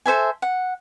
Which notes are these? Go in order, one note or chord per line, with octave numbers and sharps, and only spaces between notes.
A4 C5 E5 G#5
F#5